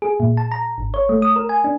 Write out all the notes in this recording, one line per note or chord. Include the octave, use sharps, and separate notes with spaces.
G#4
A#2
A5
A#5
G#1
C#5
A3
D#6
A#4
G#5
D4